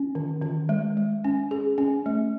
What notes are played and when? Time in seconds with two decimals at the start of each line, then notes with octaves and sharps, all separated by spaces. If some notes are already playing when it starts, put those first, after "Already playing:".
Already playing: C#4
0.15 D#3
0.42 D#3
0.69 G#3
0.97 G#3
1.24 C#4
1.51 G#4
1.78 C#4
2.06 A3